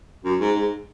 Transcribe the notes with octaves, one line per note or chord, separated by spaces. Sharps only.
F#2
G#2
G#2